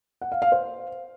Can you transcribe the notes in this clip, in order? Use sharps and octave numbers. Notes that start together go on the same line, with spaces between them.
F#5
F5
F5
C5